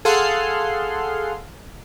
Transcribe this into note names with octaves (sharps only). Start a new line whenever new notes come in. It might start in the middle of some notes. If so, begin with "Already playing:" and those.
G#4 A4 F5 F#5 C6